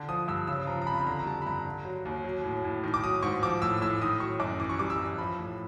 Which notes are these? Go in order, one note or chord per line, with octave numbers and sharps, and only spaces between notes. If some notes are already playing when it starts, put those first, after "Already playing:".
Already playing: D3
F3 D#6
G2 E6
C#3 E6
F3 A#5
A#5
F2 B5
B5
D3 A#5
A#5
G3 A5
B5
G2 A#5
D3
F#3
D#2
F#3
A2
A2
D#3
D6
F#3 D#6
G#2 C#6
F3 D6
A2 E6
A2 E6
D#3 D#6
F#3 C#6
F#2 D6
E3 D6
C#6
G3 D6
E6
G2
F3 B5
A2